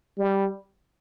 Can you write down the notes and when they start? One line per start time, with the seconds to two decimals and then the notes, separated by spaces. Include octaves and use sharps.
0.18 G3